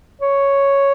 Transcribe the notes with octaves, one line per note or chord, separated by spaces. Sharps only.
C#5